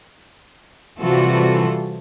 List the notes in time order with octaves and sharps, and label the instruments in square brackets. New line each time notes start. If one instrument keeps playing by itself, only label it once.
[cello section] C3 E3 G3 F4 F#4 A4